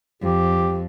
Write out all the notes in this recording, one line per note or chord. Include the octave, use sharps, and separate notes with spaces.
F2 G4